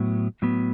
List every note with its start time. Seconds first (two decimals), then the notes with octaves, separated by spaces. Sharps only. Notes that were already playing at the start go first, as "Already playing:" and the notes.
Already playing: A2 F#3 B3
0.42 A2 F#3 B3